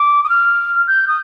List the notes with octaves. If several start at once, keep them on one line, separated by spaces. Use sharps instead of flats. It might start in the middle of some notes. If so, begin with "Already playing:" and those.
Already playing: D6
D#6
F6
G6
D#6